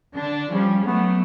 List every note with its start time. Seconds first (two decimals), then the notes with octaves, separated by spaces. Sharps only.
0.15 D3 D4
0.51 F3 G3 C#4
0.86 F#3 A3 B3